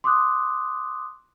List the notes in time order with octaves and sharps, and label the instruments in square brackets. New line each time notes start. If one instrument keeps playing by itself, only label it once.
[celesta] C6 D6 D#6 F#6